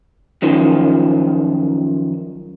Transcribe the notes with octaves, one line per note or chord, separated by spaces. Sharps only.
F#2 D#3 F3